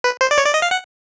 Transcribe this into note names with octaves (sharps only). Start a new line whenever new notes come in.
B4
C5
D5
C#5
D5
D#5
F5
F#5